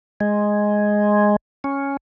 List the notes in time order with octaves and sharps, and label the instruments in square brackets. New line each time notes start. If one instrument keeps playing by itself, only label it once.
[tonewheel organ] G#3
C#4